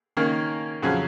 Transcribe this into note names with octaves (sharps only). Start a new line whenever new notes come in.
D#3 A#3 C#4
F2 C#3 F#3 C#4